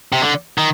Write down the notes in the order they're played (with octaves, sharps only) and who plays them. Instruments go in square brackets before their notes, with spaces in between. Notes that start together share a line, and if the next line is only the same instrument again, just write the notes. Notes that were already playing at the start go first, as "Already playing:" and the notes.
[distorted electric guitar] C3
D3
D#3